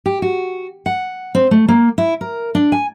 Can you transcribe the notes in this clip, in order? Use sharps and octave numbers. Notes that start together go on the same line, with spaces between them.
G4
F#4
F#5
C4
A3
A#3
E4
A#4
D4
G#5